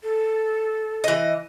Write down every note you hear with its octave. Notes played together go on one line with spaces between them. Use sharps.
A4
E3 D#5